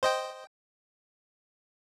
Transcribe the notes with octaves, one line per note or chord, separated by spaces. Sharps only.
C5 D#5 G5